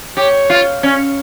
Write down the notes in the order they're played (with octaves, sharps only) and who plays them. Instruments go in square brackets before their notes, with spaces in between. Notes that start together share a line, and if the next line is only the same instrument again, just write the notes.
[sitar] G4 [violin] C#5
[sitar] F4
C#4